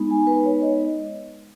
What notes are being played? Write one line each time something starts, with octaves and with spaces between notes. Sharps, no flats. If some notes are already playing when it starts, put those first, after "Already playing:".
Already playing: G#3 B3 D#4
G#5
B4
C#5
D#5